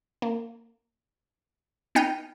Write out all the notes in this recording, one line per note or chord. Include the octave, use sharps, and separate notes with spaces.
A#3
B3 D#4 G5 F6 D#7